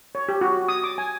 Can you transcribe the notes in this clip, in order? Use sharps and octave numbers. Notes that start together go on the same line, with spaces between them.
C#5
G4
F#4
D#6
D6
G#5